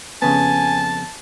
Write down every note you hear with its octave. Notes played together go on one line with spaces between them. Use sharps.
F2 C#3 B3 G#5 A5